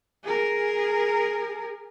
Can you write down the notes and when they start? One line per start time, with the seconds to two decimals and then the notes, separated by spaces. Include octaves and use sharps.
0.23 G#4 A#4